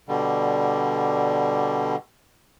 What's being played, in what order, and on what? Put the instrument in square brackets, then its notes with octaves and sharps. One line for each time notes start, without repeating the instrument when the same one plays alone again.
[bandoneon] B2 D3 G3